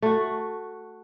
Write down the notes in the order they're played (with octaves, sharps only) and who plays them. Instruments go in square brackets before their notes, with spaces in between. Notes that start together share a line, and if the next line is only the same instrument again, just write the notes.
[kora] A3 F#4